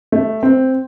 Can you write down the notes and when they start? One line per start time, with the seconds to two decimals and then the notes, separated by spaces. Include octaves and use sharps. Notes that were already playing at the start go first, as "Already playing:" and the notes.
0.12 A3
0.43 C4